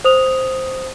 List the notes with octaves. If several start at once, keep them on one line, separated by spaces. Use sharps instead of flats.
C5 D#6 F7